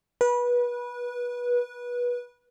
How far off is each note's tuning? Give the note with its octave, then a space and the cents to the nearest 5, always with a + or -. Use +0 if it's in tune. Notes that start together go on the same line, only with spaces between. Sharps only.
B4 -25